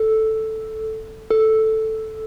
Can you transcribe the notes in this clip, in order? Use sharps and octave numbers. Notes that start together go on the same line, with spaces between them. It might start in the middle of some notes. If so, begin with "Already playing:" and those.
Already playing: A4
A4